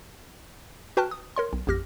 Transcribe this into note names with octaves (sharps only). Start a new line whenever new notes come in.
F#4 B4 G5 A5 F6 F#6
D#6
A#4 C#5 C6
B1
A1 F2 G4 F6 A#6